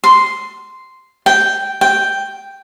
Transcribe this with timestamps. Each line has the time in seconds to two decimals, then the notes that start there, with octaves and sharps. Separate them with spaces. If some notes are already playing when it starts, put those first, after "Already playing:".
0.04 C6
1.26 G5
1.81 G5